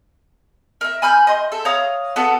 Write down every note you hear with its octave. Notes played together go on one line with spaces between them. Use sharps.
A#4 E5
G#5 B5 F6 G6
D#5 C6
A4 E5
C#5 F5 A#5 D#6
B3 F#4 A4